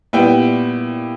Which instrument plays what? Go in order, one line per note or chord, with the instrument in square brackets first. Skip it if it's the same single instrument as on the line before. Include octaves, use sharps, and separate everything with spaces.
[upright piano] A#2 G3 B3 E4 G5